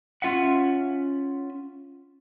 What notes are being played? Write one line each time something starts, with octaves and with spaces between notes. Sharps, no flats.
C#4 F4 E5 F#5